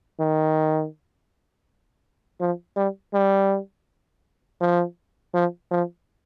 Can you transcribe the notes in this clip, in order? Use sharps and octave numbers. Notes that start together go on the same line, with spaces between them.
D#3
F3
G3
G3
F3
F3
F3